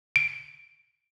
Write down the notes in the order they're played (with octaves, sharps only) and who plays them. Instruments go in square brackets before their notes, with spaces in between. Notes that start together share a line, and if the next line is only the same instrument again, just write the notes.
[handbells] D7